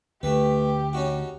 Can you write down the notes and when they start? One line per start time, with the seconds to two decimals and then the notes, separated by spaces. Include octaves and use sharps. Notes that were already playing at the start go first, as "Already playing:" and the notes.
0.23 D2 A3 G4 B4
0.93 C#4 D#4 F#4